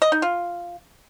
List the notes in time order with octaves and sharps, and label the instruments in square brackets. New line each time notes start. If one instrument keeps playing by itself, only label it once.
[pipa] D#5
D#4
F4